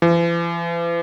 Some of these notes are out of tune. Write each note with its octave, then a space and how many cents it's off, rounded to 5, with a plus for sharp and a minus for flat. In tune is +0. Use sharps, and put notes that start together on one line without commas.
E3 +45